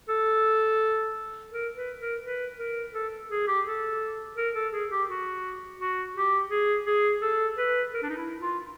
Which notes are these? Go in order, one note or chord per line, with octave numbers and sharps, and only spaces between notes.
A4
A#4
B4
A#4
B4
A#4
A4
G#4
G4
A4
A#4
A4
G#4
G4
F#4
F#4
G4
G#4
G#4
A4
B4
A#4
D4
D#4
E4
F4